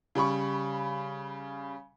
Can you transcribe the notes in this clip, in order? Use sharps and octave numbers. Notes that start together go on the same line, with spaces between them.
C#3 G3 B5 C#6